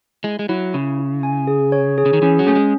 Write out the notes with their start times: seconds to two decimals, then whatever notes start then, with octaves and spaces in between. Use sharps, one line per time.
0.24 G#3 E4
0.39 G#3
0.49 F#3 E4
0.74 C#3 E4
0.99 E4
1.23 G#5
1.47 G#4
1.72 C#5
1.98 G#4
2.06 C#3
2.13 D#3
2.22 E3 C#4
2.39 F#3
2.47 A3 C#4
2.55 G#3